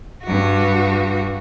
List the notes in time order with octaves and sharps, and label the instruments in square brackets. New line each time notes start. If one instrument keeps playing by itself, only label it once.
[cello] G2 F#4